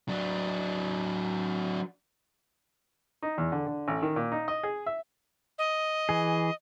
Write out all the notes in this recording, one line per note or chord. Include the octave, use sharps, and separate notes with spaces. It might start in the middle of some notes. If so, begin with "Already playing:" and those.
F#3 D4
D#4
E2
D3
D3
A1
D#3
A#2
D#4
D#5
G#4
E5
D#5
E3 G#4